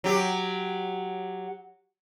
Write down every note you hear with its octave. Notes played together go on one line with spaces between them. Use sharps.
F#3 G4